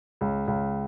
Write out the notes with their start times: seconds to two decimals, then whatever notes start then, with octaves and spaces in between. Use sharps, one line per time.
0.21 C#2
0.48 C#2